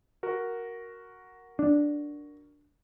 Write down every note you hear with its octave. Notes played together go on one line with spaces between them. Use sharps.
F#4 A#4
D4